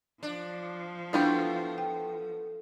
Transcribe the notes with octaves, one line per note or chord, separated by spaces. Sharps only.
F3 D4
A3 B3 D4 E4 F4 G4
G5